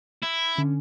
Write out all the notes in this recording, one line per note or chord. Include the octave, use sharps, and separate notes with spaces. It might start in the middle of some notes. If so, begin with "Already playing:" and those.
E4
D3 C#4